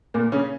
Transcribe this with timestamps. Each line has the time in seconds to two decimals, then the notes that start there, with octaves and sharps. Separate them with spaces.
0.14 A#2 A#3
0.32 C#3 C#4